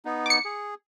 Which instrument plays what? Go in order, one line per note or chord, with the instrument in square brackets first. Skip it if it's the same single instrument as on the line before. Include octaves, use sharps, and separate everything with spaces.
[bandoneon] B3 D#4
[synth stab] D6 C#7
[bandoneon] G#4